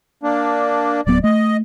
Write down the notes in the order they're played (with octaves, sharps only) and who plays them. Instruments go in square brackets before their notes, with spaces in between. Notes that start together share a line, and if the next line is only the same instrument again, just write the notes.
[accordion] A#3 D4
[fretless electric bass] D1 F#3 B3 [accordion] D5
[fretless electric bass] A3 [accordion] D#5